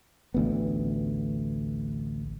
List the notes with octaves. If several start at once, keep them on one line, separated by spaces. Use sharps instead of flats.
A1 D2 B3